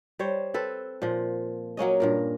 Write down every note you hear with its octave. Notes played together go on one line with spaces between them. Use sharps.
G3 C5 C#5
C4 A4 B4
A#2 F3
F#3 A#3 C#4 D#5
G2 A#2 A#4